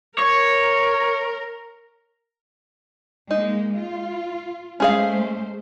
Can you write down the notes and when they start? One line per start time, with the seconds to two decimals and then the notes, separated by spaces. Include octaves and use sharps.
0.19 A#4 C#5
3.31 G#3 A#3 D#4
3.76 F4
4.80 G#3 A3 C#4 G#4 C5 F5